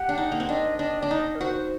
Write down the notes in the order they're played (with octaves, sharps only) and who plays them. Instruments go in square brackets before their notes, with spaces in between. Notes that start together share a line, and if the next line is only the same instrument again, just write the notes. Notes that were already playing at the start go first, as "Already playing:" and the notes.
Already playing: [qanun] G4 [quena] F#5
[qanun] D4
D#4
A#3
C4
[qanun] D4 [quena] D#5
[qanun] D4 [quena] D#5
[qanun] D4 [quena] D5
[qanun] D#4 [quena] D#5
[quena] A#4
[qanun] F#4 [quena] C5